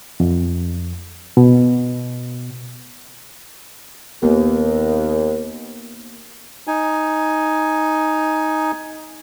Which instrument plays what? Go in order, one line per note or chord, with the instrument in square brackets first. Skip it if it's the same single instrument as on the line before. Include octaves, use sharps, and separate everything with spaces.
[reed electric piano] F2
B2
[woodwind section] D#2 [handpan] A#3 B3
[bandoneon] D#4 G#5